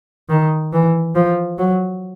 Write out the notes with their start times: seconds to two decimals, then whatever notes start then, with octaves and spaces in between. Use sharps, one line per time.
0.29 D#3
0.73 E3
1.15 F3
1.58 F#3